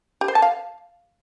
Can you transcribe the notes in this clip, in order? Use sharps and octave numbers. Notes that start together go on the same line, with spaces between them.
G4
C5
A5
F5